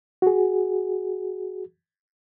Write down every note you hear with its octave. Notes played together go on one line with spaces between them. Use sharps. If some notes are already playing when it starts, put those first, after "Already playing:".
F#4 G#4